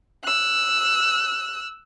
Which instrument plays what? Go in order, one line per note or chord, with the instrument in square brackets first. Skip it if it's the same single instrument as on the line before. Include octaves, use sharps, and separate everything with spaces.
[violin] E6 F#6